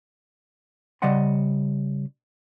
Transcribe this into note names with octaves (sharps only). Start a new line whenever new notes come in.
C#3 G3 D5 D#5 F#5 C6